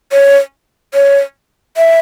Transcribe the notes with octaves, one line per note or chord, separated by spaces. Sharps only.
C#5
C#5
E5